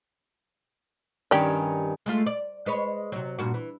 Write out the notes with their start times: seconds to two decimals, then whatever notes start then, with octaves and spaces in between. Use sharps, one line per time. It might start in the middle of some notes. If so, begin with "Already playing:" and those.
1.31 G2 D#3 C#4 G4 D5
2.06 G#3 A3 F4
2.26 D5
2.66 G#3 B4 C#5
3.12 C3 F#3
3.39 G2 A#2 F#4
3.54 E3